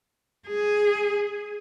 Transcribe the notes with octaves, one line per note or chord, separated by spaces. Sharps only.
G#4